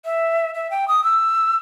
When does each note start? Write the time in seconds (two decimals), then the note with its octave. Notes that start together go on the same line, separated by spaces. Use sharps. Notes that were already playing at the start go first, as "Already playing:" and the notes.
0.05 E5
0.54 E5
0.70 G5
0.88 D#6
1.04 E6